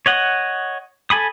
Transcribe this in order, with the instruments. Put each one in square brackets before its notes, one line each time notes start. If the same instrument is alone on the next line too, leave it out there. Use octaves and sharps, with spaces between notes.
[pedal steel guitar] C#5 D#5 F#5
A4 G#5 B5 D#6